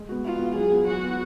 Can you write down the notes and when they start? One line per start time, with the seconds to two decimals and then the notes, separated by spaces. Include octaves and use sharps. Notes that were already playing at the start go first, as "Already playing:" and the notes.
Already playing: G#3
0.09 B3 F#4
0.24 G#3 F4
0.39 B3 F#4
0.55 F#3 G#4
0.72 B3 F4
0.87 F#3 F#4
1.03 B3 F4